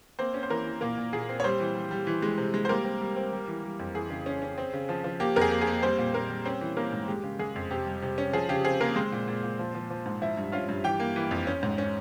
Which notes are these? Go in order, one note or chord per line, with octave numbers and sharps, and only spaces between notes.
A#3 C4 C5
C#4
C5
E3 A#3 A#4
E3
A#2 A#3 A#4
A#2
A#2 G#4
C4
C#5
G3 C4 C5
E3
G3
G3
E3
G#3
C3
G#3
C5
G3 A#3 A#4
C4
G3
C4
G3
E3
G3
F2
E3 G#4
C#3
C#4
C#4
C4
C#3
F3
F3
A#3 G4
F2 A#4
G#4
A#3
G#4
A#3
G3 C4 C5
A#2
A#2 A#3 A#4
G3
C4 C#4 C5
E3
A#3 C#4 A#4
G#2
G#3 G4
C#3
G#3 G#4
F2
C3 G4
G3
C3
C#4
F3 G#4
C#3 G4
C4 G#4
A#3 C4 A#4
G#3 C4 C5
A#2
A#2
A#2
F3
F3
F3
G#2
F3 E4 E5
G2
C#4 F4 F5
G2
E3 G4 G5
A#3
E3
F2
C#4
G#2
C#4